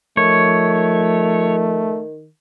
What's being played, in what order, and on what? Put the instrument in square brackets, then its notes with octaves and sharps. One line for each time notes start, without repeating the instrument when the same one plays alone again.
[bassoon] D#3 [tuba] F3 [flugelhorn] A3 [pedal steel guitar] C#5